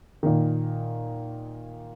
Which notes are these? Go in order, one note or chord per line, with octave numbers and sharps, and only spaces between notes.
A#2 D#3